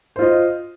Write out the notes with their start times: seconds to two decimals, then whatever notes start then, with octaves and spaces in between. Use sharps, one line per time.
0.16 C5
0.19 F4
0.22 D#5